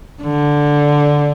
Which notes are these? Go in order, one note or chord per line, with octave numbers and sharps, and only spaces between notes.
D3